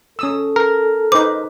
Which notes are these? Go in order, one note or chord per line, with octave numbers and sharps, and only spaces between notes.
C#4 A4 D#6 E6
A#4
D#4 B4 C5 D6